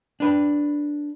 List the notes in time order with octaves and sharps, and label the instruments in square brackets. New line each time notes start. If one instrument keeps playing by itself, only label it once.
[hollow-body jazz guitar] D4 B4